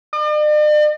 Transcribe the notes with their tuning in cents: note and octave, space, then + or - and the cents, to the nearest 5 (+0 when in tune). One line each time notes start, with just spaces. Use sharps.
D5 +45